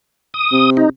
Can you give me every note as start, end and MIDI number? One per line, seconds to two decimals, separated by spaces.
0.34 0.70 87
0.52 0.84 48
0.77 0.89 63